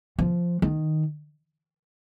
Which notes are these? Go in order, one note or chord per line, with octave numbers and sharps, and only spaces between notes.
F3
D#3